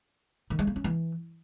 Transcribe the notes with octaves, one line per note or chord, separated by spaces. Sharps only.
D#3
G#3
A#3
C#4
E3